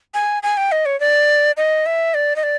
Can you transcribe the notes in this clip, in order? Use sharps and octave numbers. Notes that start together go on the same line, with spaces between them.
G#5
G#5
G5
D#5
C#5
D5
D#5
E5
D5
D#5
D5